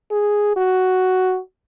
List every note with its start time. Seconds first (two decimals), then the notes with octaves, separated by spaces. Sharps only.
0.11 G#4
0.56 F#4